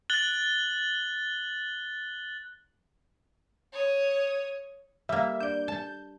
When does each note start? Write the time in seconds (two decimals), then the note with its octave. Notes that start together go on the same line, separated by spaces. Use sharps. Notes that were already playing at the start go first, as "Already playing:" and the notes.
0.10 F#6 A6 F#7 G7
3.73 C#5 D#6
5.09 G3 A#3 E5
5.41 D4 D5 G6
5.68 A5